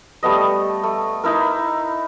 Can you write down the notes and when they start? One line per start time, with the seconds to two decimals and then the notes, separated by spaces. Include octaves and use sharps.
0.23 G3 A3 B3 D#5
0.84 A3
1.23 D#4 E4 A#4